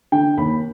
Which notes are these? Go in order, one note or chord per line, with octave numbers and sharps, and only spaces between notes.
D3 G5
D#2 B5